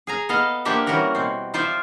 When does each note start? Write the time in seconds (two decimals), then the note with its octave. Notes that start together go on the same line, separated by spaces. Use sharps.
0.07 G#4 G#5 A#5
0.29 B3 A4 D#5 F5
0.65 F3 A#3 D4 G4 E5 F#5
0.86 E3 G3 C#4 F#4 A#4 F#5
1.15 B2 C4
1.54 F3 F4 C5 D5 E5